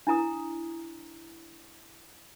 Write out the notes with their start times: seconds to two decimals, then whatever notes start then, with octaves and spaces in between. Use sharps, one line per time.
0.07 D4 E4 A#5 D#6